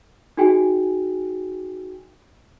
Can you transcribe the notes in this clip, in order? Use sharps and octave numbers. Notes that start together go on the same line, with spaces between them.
D#4 F#4 G#4 G5 G#5